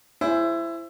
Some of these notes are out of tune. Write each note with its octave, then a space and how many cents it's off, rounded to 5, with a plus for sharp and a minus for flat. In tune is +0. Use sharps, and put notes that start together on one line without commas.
E4 +20 G#4 +0 C5 +0